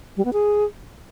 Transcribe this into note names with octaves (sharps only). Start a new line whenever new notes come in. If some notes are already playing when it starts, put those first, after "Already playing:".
G3
B3
G#4